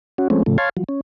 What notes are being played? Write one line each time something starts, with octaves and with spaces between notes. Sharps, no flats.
C#4 F#4
F3 G#3 A3 C4 C#4
A2 C#3 F3 A3
C#5 F5 G#5 A5 C6
F3 F#3
C#4